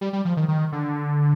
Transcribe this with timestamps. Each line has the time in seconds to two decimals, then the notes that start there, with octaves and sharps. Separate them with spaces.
0.01 G3
0.13 G3
0.25 F3
0.37 D#3
0.48 D#3
0.72 D3